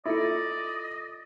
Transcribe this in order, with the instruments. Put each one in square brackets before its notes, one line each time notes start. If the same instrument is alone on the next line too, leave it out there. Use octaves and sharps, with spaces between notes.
[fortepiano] E4 [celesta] F4 A4 C#7 [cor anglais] D5 [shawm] D#5